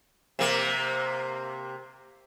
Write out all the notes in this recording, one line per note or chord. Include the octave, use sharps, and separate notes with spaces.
C3 A#3